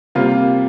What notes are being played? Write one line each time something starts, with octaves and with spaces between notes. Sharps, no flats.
C3 G3 A#3 F4